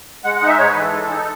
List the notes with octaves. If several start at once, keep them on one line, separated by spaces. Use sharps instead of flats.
G#3 F#5
F#5
D#4
E5
G#2 C#5
E3 B4
A4
G#3
D#4